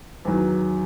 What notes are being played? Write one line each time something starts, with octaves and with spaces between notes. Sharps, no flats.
E2 D#3 F#3